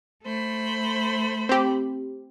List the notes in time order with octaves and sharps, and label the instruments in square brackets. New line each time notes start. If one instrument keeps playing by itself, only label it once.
[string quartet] A3 C5 B5
[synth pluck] C4 G4